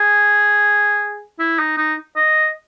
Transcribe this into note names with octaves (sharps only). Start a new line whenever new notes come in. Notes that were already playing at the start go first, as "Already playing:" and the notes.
Already playing: G#4
E4
D#4
D#4
D#5